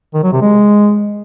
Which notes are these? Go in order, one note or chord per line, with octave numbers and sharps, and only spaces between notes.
D#3
F#3
C3
G#3